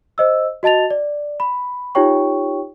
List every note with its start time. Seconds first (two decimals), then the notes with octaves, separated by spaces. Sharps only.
0.18 C5 D#5 E6
0.63 F#4 D#5 A5 A6 F7
0.91 D5
1.40 B5
1.95 D#4 F4 G4 C#5 G5 C#6